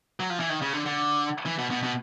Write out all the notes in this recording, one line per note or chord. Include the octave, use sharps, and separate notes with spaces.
F#3
F3
E3
D#3
C#3
D3
D3
E3
B2
B2
B2